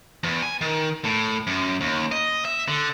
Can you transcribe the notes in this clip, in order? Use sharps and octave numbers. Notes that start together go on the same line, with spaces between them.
E2
G#5
D#3
A2
F#2
D#2
D#5
E5
D3